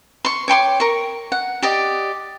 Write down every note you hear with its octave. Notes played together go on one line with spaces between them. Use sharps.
C6 C#6
C#5 G5 C6 D6
A#4 C#6
F#5
G4 D5 D#5